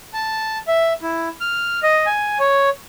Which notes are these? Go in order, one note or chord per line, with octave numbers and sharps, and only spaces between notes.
A5
E5
E4
F6
D#5
G#5
C#5